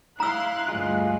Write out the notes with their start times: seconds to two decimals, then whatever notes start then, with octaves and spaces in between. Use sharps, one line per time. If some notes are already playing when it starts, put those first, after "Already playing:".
0.20 E4 F5 A#5 C6 E6 F#6
0.68 D2 G2 G#3 F4